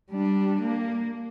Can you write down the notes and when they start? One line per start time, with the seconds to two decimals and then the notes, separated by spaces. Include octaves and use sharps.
0.11 G3 D4
0.62 A#3